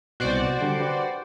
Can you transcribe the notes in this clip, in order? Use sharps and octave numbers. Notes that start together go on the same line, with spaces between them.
C2 B2 F#4 C5 D5
D3 G3 D4
G4 B4 F#5